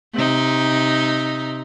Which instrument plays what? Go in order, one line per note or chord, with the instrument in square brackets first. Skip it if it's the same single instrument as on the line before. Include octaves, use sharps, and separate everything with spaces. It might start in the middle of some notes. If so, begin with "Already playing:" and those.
[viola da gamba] C3 D#4